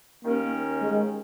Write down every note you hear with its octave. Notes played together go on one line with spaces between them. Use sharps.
D#2 D#3 A#3 C#4 A#4
G#3